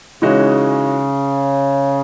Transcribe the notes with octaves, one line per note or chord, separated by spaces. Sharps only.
C#3 E3 G#3 D#4 F#4